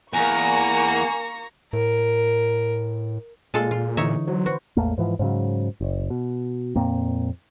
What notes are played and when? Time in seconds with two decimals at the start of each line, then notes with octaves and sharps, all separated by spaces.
0.13 E2 A#3 G#5 A#5 C#6 A#6
1.73 A2 A#4
3.54 A#2 G#3 F4 A4
3.71 F4
3.97 D3 E3 D#4 C#5 E5
4.27 F#3 C5
4.46 F#4 B4 C5
4.77 A1 E2 A3 A#3
4.98 G#2 E3 F3
5.19 G#2 C#3 F#3
5.81 F#1
6.10 B2
6.76 F2 A#2 A#3 C4